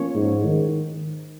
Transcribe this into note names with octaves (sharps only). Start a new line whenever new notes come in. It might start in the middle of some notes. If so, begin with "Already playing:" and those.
Already playing: F3 A#3 C#4 C#5
G#2
D#3